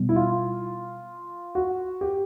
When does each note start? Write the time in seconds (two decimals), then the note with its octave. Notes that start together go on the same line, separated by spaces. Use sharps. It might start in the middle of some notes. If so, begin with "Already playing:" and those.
Already playing: B2 G3 B3
0.09 E4
0.16 F4
1.55 F#4
2.01 G4